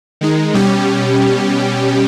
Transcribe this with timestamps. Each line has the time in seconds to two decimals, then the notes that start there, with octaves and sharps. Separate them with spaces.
0.21 D#3 G#3 D#4
0.54 B2 G3 C#4 G4